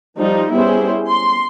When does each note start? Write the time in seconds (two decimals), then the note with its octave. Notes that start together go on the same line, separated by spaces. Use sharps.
0.18 F3 G3 D#4
0.53 G3 B3 C#4 E4 G#4 C5
1.08 C6